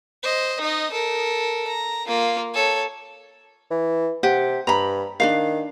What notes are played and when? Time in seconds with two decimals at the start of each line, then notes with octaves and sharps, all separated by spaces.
0.24 C5 D#5
0.61 D#4 D#5
0.92 A4 A#4
1.68 A#5
2.07 A#3 F4
2.54 A4 C#5
3.71 E3
4.23 C3 G4 F#5
4.67 G2 A#5 B5
5.20 D#3 D4 F#4 F5